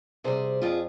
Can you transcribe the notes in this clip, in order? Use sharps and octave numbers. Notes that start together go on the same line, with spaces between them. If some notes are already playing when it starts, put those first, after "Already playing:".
C3 G3 G#4 C5
F2 F4 G#4